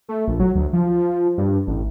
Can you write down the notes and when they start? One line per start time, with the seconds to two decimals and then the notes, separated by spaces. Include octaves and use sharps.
0.09 A3
0.28 A#1
0.40 F#3
0.55 D2
0.73 F3
1.38 G2
1.67 A1